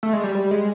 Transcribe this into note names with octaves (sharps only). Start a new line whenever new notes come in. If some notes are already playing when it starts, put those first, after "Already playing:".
A3
G#3
G3
G3
G#3